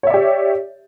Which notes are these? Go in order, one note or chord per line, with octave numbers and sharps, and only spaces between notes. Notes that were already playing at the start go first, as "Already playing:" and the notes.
G4 C#5 D5 E5